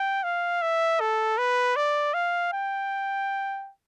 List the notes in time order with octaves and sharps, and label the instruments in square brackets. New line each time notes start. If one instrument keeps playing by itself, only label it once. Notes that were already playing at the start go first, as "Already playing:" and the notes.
Already playing: [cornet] G5
F5
E5
A4
B4
D5
F5
G5